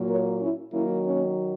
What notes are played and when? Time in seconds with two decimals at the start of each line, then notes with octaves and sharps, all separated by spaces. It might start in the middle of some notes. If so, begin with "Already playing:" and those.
Already playing: A#2 F#3 A#3
0.10 A#4 C#5
0.41 C#4 E4
0.72 D#3 F#3 A#3 C#4 E4
1.04 A#3 C#4